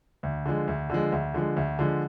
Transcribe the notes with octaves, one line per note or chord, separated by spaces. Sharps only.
D2
D3 F3 G#3
D2
D3 F3 G#3
D2
D3 F3 G#3
D2
D3 F3 G#3